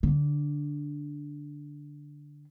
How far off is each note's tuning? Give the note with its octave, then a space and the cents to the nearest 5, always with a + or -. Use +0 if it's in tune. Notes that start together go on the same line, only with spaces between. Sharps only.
D3 -5